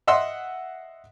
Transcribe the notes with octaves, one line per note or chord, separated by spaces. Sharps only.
D#5 E5 F#5 C6 E6